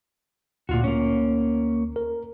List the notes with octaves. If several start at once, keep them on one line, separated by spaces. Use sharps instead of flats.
D2 A#2 F4 F#4
A#3 C#4
A#4